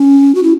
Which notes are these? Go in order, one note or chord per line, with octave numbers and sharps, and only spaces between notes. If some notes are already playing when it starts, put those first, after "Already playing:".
Already playing: C#4
F#4
E4